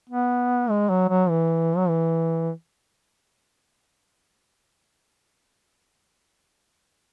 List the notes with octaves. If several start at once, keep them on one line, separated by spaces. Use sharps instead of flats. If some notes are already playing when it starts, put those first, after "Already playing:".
B3
G#3
F#3
F#3
E3
F#3
E3